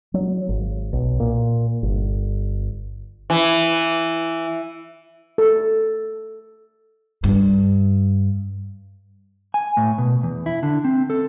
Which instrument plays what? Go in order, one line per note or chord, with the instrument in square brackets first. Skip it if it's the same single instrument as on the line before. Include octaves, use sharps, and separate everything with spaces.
[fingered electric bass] F#3
G#1
B1
A#2
G1
[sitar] E3
[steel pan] A4
[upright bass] G2
[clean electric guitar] G#5
A2
B2
E2
E4
D3
C4
A4